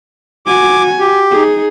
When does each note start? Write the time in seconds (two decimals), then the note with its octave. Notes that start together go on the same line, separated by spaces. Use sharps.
0.46 F#4 G#5 D6
1.00 G4
1.31 D#4 G#4